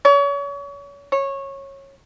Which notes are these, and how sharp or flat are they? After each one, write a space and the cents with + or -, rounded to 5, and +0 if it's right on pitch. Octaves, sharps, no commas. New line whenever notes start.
C#5 +35
C#5 -15